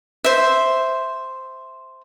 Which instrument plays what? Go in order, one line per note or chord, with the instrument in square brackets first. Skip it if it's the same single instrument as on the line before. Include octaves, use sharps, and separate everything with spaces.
[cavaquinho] C5 E5